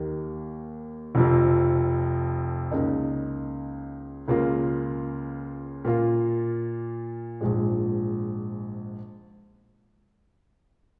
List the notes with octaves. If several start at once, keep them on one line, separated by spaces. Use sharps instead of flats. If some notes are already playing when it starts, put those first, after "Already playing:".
Already playing: D#2 D#3 A#3
F1 F2 F3
C#2 C#3 A#3 D#4
C#2 C#3 A#3 F4
A#2 A#3 F4
A#1 G#2 F3 G#3